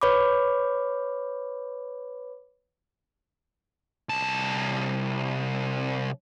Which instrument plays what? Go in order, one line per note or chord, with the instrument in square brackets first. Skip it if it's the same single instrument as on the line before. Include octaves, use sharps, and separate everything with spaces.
[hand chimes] B4 C#5 B5 D6
[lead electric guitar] C2 A5